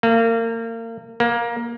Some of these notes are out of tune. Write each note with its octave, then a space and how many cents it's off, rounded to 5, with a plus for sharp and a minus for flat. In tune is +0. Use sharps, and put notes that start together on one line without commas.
A#3 -35
A#3 +15